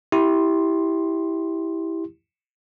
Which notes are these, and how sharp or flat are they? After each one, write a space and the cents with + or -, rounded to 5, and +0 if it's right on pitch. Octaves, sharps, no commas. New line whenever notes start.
E4 -10 G4 +0 C6 +10